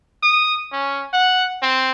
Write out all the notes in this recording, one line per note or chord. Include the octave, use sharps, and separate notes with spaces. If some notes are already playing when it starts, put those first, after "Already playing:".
D#6
C#4
F#5
C4